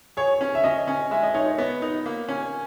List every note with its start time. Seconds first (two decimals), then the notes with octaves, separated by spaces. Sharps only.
0.17 G#4 C#5
0.41 C#4
0.55 E5
0.64 C#4 D#5
0.88 C#4
1.11 G#3 E5
1.23 D#5
1.34 D#4 C#5
1.47 C#5
1.58 B3
1.82 D#4
2.06 A#3
2.29 C#4